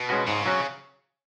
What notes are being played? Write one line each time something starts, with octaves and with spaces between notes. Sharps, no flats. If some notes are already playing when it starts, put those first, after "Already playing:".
Already playing: B2
G#3 C#4 F#4 B4
G#2 C#3
F#3 C#4 F#4